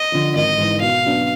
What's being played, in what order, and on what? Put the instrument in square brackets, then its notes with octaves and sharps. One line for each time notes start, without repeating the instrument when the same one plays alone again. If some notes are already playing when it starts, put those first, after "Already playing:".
Already playing: [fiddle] D#5
[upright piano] D3 F3
[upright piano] G#1 [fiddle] D#5
[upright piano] G#2 E3
[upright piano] B2 [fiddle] F5
[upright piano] F#3 B3 D4